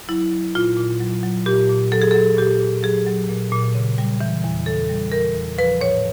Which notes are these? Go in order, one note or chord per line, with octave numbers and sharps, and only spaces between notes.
F#3 E4
F#3
A#2 F4
A#2
F#3
F#3
A#2 G4
A#2
F#3 A4
G#4
F#3 A4
A#2 G4
A#2
F#3 G#4
F#3
A#2
A#2
C#3
G3
E3
E2
C#3 A4
G3
E3 A#4
E2
F3 B4
A2 C#5